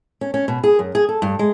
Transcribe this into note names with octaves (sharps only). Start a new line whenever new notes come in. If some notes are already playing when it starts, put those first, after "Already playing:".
C#4
C#4
B2
G#4
F#2
G#4
A4
G2
G#3